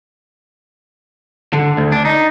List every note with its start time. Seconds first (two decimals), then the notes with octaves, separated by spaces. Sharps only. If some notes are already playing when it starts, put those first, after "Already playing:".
1.53 D3
1.77 D2
1.92 D4
2.05 D#4